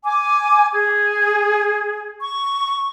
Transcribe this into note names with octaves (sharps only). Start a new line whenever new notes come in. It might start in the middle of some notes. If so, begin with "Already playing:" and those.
G#5 D6
G#4
C#6